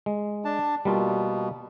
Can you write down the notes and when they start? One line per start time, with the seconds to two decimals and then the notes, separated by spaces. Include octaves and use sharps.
0.06 G#3
0.45 D4 A5
0.85 B2 G3 A#3 F4